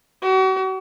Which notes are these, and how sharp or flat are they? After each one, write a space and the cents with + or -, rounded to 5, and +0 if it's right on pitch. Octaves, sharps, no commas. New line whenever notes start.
F#4 +40